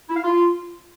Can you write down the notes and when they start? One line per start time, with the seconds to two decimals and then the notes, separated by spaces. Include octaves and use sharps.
0.09 E4
0.16 F5
0.23 F4